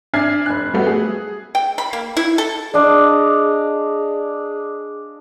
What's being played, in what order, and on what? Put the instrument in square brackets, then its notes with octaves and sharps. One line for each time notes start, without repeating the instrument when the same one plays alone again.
[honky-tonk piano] D4 E5 G#5 F6 G#6 C7
F1 F#6
G3 A3 B3 F#4
G#4
[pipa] G5
B5
A#3
E4
A4
[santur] D4 D#5 F5 [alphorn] G#4 [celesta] D5